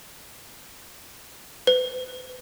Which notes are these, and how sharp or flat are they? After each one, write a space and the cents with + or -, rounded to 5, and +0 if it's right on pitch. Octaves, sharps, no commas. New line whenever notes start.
B4 +40